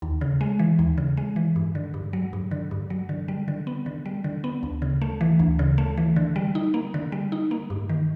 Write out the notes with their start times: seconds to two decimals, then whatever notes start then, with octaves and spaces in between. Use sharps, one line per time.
0.02 D#2
0.21 C#3
0.41 G#3
0.59 E3
0.79 D#2
0.98 C#3
1.17 G#3
1.36 E3
1.56 G2
1.75 D3
1.94 G2
2.13 F#3
2.33 G2
2.51 D3
2.71 G2
2.90 F#3
3.09 D3
3.28 G3
3.48 D3
3.67 B3
3.86 D3
4.06 G3
4.24 D3
4.44 B3
4.63 D2
4.82 C#3
5.02 A3
5.21 E3
5.39 D2
5.59 C#3
5.78 A3
5.97 E3
6.16 D3
6.36 G3
6.55 D#4
6.74 A#3
6.94 D3
7.12 G3
7.32 D#4
7.51 A#3
7.70 G2
7.89 D#3